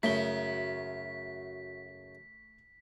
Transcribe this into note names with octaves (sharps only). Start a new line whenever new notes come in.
F#2 C#3 A3 F#4 E5 B6 G7